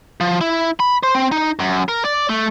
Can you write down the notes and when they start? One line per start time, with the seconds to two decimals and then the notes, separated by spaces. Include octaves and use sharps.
0.20 F3
0.41 E4
0.80 B5
1.03 C5
1.15 C4
1.32 D#4
1.59 F#2
1.88 A#4
2.05 D5
2.29 A3